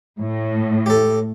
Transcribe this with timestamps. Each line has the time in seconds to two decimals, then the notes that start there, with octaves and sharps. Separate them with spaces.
0.20 A2
0.86 G4 A4